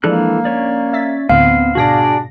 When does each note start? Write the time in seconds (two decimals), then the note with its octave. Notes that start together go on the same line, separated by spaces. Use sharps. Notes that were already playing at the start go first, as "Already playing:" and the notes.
0.04 E3 F3 G#3 A#3 D4 A4 F#6
0.45 C#4 C#5 D5
0.93 E5 A6 B6
1.29 D2 A2 D3 B3 C4 F5
1.75 G#2 B2 D4 F#4 G#4 D5 A#6